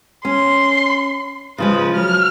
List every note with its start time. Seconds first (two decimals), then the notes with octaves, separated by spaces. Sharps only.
0.25 C#4 C6
1.58 C#3 F3 G#3 B4
1.95 F#3 F6